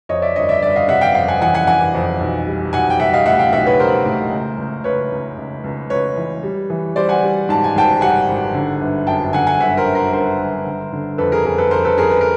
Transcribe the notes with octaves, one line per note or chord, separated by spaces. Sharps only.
F2 C#5 D#5
D5 E5
G1 C#5 D#5
D5 E5
G1 D5 E5
D#5 F5
C3 E5 F#5
F5 G5
F2 F5 G5
F#5 G#5
E3 F#5 G#5
F#5 G#5
E3 F#5 G#5
F2
B1
G3
B1 F#5 G#5
G5
G3 E5 F#5
D#5 F5
A2 E5 F#5
F5 G5
B1 E5 F#5
B4 C#5
G3 A#4 C5
A2
C#2
C#2
C#2 B4 C#5
C#2
C#2
C#2
C#2 B4 C#5
E3
G3
E3
G3 C5 D5
F#5 G#5
G3
G#2 A5
G#5
G#1 G5 A5
G3 F#5 G#5
G#1
D3
G1
F#2 G5 A5
D3 F#5 G#5
F#5 G#5
G1 E5 F#5
A#4 C5
F#2
A#4 C5
G1 A#4 C5
G1
D3
D3
F2 A4 B4
G#4 A#4
F2 G#4 A#4
A4 B4
F2 A#4 C5
A4 B4
F2 G#4 A#4
B4
A#4